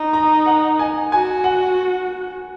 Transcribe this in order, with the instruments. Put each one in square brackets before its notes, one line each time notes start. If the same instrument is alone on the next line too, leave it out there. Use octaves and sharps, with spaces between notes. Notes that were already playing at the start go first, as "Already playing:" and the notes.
Already playing: [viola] D#4 [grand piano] A#5
[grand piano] A#5
F#5
G#5
[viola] F#4 [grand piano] G#5
[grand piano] F#5